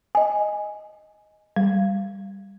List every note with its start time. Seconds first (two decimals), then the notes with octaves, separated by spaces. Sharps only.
0.15 D#5 G#5
1.56 G3